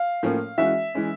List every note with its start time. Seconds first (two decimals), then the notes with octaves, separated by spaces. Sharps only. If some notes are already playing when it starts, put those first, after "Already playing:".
Already playing: F5
0.23 A2 F3 A#3 C#4
0.58 E3 G#3 C#4 F#4 E5
0.95 E3 G#3 C#4